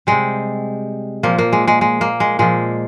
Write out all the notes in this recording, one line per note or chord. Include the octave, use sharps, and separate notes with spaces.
C3 G3 G#3
A#2 F3 A#3
A#3
G#3
G#3
G#3
A#3
G#3
A#2 F3 G#3